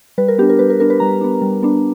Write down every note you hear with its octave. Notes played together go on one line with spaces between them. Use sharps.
G3 B4
A#4
B3 D4 G4
A#4
G3 B4
A#4
B3 D4 A#4
B4
G3 A#5
B3 D4
G3
B3 D4